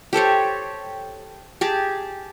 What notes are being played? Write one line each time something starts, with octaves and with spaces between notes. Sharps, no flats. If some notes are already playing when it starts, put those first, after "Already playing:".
G4 A4 C5 C#5
G4 G#4 A5